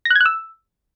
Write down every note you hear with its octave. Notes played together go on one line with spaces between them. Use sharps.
A#6
F#6
G#6
F#6
E6